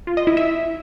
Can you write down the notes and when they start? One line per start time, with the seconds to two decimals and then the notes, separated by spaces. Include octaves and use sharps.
0.07 F4
0.17 D#5
0.27 E4
0.37 E5